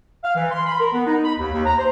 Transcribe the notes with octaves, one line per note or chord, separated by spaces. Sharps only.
F5
E3
C6
B5
A#4
B3
D#4
B5
D#2
D#2
A#5
C5